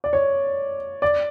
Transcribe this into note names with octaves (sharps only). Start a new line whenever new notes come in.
D5
C#5
D5